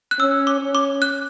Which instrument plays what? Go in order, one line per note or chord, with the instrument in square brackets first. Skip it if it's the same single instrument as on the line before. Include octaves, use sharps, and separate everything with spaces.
[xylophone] F#6
[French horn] C#4 [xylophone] E6
[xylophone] D6
[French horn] C#4
[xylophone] D6
F#6